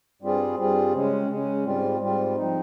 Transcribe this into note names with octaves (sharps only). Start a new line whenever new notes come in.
G2 G3 C4 F4 G#4
G2 G3 C4 F4 G#4
C#3 G#3 C#4
C#3 G#3 C#4
G#2 G3 C4 F4
G#2 G3 C4 F4
F3 C4 D#4